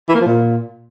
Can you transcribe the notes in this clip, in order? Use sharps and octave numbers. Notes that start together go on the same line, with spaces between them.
E3
A#3
F3
A#2